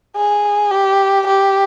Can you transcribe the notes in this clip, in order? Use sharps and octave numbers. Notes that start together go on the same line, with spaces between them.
G#4
G4
G4